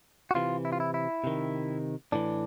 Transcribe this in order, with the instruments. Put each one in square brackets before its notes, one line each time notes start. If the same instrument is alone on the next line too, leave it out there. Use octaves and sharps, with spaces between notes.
[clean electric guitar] F#4
C3 E3 F4
E4
F4
E4
E4
C3 D#3
A2 E3 D4